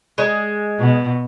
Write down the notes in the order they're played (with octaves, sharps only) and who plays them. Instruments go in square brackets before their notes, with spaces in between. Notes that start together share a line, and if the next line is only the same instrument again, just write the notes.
[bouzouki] G#3
[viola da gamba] B2